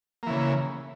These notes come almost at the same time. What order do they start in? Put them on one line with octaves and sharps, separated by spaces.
A#3 E3 C#3